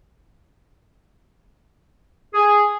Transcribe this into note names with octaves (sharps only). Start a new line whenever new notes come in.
G#4